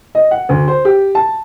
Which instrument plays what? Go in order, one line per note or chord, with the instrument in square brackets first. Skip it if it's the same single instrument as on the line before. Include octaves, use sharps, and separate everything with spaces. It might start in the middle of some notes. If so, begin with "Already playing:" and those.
[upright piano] D#5
F#5
D2
C5
G4
A5